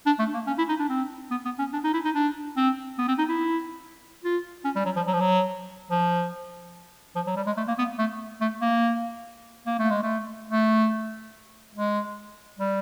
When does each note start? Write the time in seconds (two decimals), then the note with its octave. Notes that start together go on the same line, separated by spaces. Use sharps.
0.06 D4
0.19 A3
0.34 A#3
0.47 C#4
0.58 E4
0.69 D#4
0.80 D4
0.89 C4
1.31 B3
1.45 B3
1.59 C#4
1.73 D4
1.84 D#4
1.94 E4
2.05 D#4
2.15 D4
2.57 C4
2.99 B3
3.08 C4
3.19 D#4
3.29 E4
4.24 F4
4.65 C#4
4.76 G3
4.86 F#3
4.96 F3
5.07 F#3
5.14 F3
5.21 F#3
5.91 F3
7.16 F3
7.27 F#3
7.37 G3
7.47 G#3
7.57 A3
7.68 A#3
7.79 B3
7.99 A3
8.41 A3
8.62 A#3
9.67 A#3
9.79 A3
9.91 G#3
10.03 A3
10.50 A3
11.75 G#3
12.59 G3